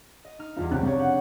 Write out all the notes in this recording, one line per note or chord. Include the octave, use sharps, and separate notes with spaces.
D#5
D#4 F6
E2 G3 F4 A#5
F1 C#2 C4 G4 F#6
C3 D4 G4 C#5
G4 F#5